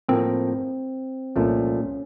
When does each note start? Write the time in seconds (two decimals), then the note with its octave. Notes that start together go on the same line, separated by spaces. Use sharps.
0.08 A2 F3 A#3 C4
1.36 C2 A#2 F3 A3 C#4